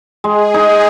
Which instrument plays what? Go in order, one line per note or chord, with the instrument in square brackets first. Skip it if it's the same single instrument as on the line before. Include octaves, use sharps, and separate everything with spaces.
[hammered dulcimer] G#3 [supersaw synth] G#4
[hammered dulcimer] D#4